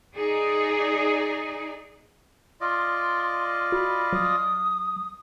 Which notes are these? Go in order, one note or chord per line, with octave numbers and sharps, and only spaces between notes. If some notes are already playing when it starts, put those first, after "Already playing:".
D#4 G#4 D5
F4 D5 D#5 C6
F#4 B5
F#3 D#6